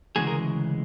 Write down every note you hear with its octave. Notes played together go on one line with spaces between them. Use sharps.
D2 C#3 E3 G#3 F#4 G#4
G#4 A#4